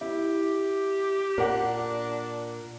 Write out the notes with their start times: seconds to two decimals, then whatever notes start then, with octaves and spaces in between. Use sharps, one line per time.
0.01 E4 G4
1.38 A#2 D4 A#4 F#5